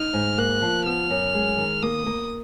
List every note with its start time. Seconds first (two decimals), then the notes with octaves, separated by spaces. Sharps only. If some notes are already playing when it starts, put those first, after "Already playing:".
Already playing: D#4 F6
0.13 G#2
0.38 A#3 F#6
0.62 F3
0.86 B3 F6
1.10 F#2
1.34 G#3
1.58 D#3
1.82 A#3 D#6
2.06 A#3